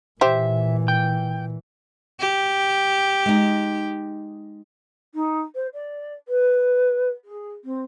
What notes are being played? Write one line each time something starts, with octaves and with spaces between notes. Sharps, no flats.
A#2 E3 G4 C5 E5
G5
G4
G#3 D#4
D#4
C5
D5
B4
G#4
C4